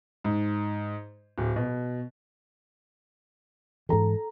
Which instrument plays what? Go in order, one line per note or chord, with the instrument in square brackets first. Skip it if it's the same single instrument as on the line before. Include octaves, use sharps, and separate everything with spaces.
[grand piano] G#2
D1
B2
[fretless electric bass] G#2 E3 [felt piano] A4 A#5